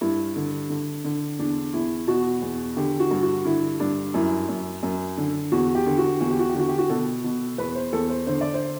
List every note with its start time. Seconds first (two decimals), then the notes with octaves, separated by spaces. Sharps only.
0.01 G2 E4
0.36 D3
0.70 D3
1.04 D3
1.39 E2 D4
1.73 E2 E4
2.07 B2 F#4
2.42 E2
2.77 D3 G4
3.00 F#4
3.11 G2
3.23 F#4
3.45 D3 E4
3.80 G2 D4
4.14 F#2 E4
4.49 F#2
4.83 F#2
5.17 D3
5.52 E2 F#4
5.75 G4
5.86 D3
5.98 F#4
6.21 E2 F#4
6.30 G4
6.39 F#4
6.49 G4
6.55 D3 F#4
6.69 G4
6.78 F#4
6.89 B2 A4
7.24 B2
7.58 E2 B4
7.75 C5
7.93 E2 A4
8.10 C5
8.27 D3 C5
8.41 D5
8.54 C5